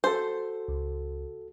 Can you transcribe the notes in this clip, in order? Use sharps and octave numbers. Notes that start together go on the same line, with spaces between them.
F#4 A4 C5
C#2